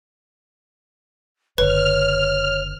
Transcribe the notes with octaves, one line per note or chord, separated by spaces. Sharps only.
F#1 D3 B4 C#5 F6